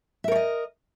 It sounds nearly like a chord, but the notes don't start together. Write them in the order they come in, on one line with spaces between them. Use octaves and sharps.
E5 A#4 C#5 D#5